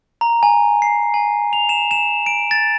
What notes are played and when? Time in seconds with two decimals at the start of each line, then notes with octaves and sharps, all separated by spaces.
0.21 A#5
0.43 G#5
0.82 C7
1.14 G#5
1.53 F7
1.69 E7
1.91 E7
2.26 D7
2.51 A6